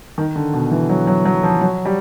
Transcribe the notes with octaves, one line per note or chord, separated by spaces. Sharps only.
D#3
D3
B2
E3
F#3
F#3
F#3
F3
F#3
G3